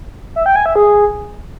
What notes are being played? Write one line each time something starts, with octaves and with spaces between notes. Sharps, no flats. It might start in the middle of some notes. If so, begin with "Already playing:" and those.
E5
G5
G#5
E5
G#4